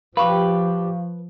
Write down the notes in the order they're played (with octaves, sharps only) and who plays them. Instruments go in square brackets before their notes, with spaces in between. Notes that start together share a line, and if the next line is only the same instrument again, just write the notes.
[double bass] F3 [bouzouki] G3 D4 G4 [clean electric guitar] B4 [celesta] F5 C#6